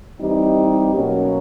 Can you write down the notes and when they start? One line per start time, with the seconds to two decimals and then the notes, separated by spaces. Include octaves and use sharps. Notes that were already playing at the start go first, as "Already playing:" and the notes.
0.19 E3 G3 C4 D#4 G4
0.92 B2 F#3 A#3 C#4 F#4